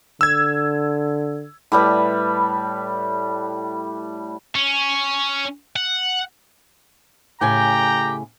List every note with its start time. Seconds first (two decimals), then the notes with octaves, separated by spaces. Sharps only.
0.21 D3 E6 G#6
1.72 A2 G3 B4
4.55 C#4
5.76 F#5
7.41 A2 C#3 G4 G5 G#5 A#5